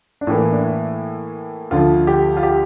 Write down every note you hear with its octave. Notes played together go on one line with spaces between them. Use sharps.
D4
A2 E3 A#3 E4
D4
E4
D2 D3 F3 F4
G4
F4
G4